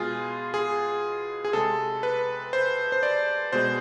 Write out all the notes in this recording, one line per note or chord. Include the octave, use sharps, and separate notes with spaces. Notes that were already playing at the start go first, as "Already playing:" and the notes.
Already playing: B2 G#3 F4 G#4
G#4
G#4
C3 G#3 A4
B4
C5
C5
D5
B2 G#3 C5